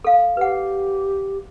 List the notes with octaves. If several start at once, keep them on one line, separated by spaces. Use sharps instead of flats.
A4 F5
G4 B4 F#5